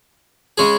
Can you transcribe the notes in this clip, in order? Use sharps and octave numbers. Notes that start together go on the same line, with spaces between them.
C#3 G#3 C#4 G#4